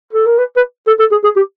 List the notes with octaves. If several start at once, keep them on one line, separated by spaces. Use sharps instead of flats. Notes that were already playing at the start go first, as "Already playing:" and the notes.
A4
A#4
B4
B4
A4
A4
G#4
G#4
G4